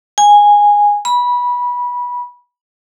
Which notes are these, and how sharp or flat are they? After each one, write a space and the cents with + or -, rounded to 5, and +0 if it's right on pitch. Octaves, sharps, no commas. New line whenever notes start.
G#5 -10
B5 -20